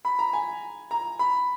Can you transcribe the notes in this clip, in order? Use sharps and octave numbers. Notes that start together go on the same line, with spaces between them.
B5
A#5
G#5
A#5
B5